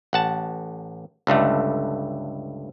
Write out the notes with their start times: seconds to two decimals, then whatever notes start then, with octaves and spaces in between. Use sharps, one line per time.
0.13 A1 F#5 A5
1.27 C#2 G2 D3 A3